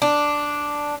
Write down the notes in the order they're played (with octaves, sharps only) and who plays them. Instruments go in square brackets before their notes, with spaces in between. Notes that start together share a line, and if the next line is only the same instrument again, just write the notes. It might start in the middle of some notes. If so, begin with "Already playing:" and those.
[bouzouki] D4